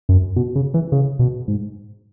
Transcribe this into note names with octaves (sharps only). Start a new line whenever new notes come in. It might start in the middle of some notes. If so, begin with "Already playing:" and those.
F#2
B2
C#3
E3
C#3
B2
G#2